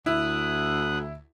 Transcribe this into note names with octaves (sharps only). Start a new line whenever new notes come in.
D2 E4 D#6 F#6